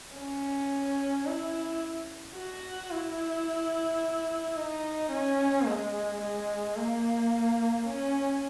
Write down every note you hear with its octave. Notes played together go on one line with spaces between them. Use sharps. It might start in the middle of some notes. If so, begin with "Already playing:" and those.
C#4
E4
F#4
E4
D#4
C#4
G#3
G#3
A#3
C#4